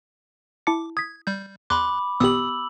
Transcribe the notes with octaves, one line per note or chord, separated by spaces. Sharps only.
E4 A5 D6 C#7
D#6 G#6 B6
G3 G6
E2 B5 C6 D6 F#6
G#1 A#2 B3 G4 D#6 E6 F#7